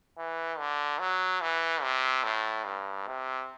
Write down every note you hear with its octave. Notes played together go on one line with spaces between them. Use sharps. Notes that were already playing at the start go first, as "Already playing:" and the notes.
E3
D3
F#3
E3
C3
A2
G2
C3